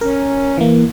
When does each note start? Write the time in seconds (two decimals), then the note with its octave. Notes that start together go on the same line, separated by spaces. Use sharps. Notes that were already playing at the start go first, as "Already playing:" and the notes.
0.01 C#4 A#4
0.58 E3 A#3